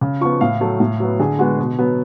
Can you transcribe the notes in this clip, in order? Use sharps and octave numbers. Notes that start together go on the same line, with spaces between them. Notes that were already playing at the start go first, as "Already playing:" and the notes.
C#3
F3 B3 C#6
A2 F5
F#3 A3
A2
F#3 B3
D3 G#4
G#3 B3 F#4
B2
F#3 B3